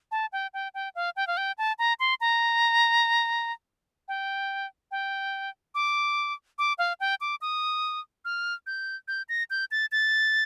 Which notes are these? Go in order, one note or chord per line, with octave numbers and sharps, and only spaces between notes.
A5
G5
G5
G5
F5
G5
F5
G5
A5
A#5
C6
A#5
G5
G5
D6
D6
F5
G5
D6
D#6
F6
G6
G6
A#6
G6
A6
A6